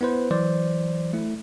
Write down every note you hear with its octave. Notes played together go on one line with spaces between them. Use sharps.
B3 E4 B4 C5
E3 F#3 C5 D5
A3 E4